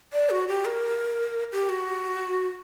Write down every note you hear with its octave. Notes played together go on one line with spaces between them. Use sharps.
D5
F#4
G4
A#4
G4
F#4